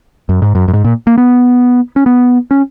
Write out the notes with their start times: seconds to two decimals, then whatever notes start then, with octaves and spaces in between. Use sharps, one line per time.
0.29 F#2
0.42 G#2
0.55 F#2
0.68 F#2
0.73 G#2
0.84 A#2
1.07 A#3
1.18 B3
1.96 C#4
2.06 B3
2.51 C#4